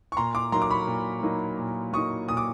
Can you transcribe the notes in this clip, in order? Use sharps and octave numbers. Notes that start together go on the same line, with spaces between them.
C#6
A#2 A#5 C6
C6 D6
F#3 A#3 D#4 A#5 C6
D6
B5 C#6
A#2
F#3 A#3 D#4
A#2
F#3 A#3 D#4 C#6 D#6
A#2 D#6
D6